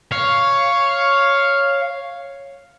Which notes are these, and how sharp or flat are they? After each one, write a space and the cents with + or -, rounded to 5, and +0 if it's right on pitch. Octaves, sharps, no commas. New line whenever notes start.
C#5 +0 F5 +0